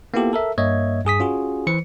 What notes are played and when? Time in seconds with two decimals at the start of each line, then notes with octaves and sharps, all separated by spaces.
0.14 A#3 B3 E4 F4 G4 A4
0.33 A4 A#4 E5
0.58 G2 A#3 C#5 D#5 E5 G#6
1.05 G2 G#4 D#6 B6
1.20 C#4 F4 F#4 G#4
1.67 E3 B4 C5 C#7